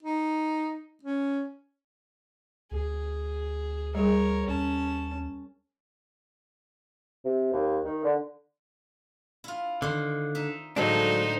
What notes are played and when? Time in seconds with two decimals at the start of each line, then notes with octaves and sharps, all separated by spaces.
0.03 D#4
1.03 C#4
2.71 D2 G#4
3.95 G3 G#4 A#4 C#5
4.48 D#2 C#4 A5
7.25 C3
7.53 D#2
7.85 D#3
8.04 D3
9.44 E4 F4
9.82 D3 D#3 C5
10.35 D#4 E5
10.76 A2 D3 F3 F#3 G#3 D4 D#4 C5